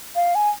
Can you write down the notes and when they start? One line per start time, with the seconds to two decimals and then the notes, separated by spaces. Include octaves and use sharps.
0.16 F5
0.35 G#5